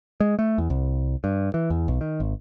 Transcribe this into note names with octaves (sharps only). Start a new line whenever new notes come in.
G#3
A3
E2
C2
G2
E3
E2
B1
D#3
G#1